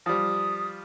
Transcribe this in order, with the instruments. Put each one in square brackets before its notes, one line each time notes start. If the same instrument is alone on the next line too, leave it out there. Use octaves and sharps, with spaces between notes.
[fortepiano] F3 G3 [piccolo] D#6